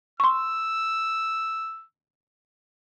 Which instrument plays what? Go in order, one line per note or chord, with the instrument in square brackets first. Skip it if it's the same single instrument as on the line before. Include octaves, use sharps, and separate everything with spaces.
[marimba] C6 C#6 [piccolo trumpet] E6